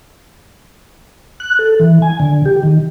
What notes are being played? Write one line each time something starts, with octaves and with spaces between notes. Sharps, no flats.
F#6
A4
E3
G#5
D3
G4
D#3